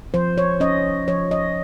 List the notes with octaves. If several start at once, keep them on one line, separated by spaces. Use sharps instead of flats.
F3 C5
C#5
C#4 D#5
F3 C#5
D#5